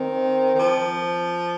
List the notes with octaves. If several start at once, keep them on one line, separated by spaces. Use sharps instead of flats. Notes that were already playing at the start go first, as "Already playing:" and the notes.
Already playing: D#3 C4
D#3
F3